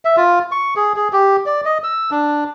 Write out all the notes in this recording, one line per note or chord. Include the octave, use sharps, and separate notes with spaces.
E5
F4
C#6
G#4
G#4
G4
D5
D#5
E6
D4